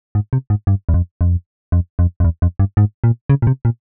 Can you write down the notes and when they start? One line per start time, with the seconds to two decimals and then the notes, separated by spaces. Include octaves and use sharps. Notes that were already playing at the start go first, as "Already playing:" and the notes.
0.15 G#2
0.33 C3
0.50 G#2
0.67 G2
0.89 E2
0.94 F2
1.21 F2
1.72 F2
1.99 F2
2.20 F2
2.24 E2
2.42 F2
2.59 G2
2.77 G#2
3.04 A#2
3.30 C#3
3.42 A#2
3.47 C3
3.65 A#2